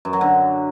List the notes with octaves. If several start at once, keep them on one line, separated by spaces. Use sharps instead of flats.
F#2
F#3
D3